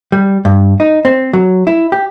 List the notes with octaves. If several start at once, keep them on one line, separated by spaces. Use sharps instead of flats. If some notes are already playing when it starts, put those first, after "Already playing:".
G3
G2
D#4
C4
F#3
E4
G4